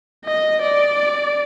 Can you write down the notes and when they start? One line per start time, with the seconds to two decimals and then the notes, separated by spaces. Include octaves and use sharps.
0.25 D#5
0.62 D5